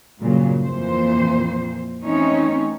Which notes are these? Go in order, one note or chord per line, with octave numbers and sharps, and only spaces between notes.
G2 A#2 C#3 F#3
F2 A#2 E3 C5
E3 A3 C4 C#4 D#4 C#5